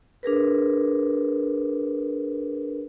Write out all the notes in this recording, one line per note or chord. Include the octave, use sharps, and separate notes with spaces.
D4 G#4 A#4 B4